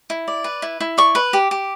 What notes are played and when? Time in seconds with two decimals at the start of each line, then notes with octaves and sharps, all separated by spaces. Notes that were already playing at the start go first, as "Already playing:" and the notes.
0.10 E4
0.28 D5
0.44 B4
0.62 E4
0.80 E4
0.98 D5 C#6
1.15 B4
1.33 G4
1.51 G4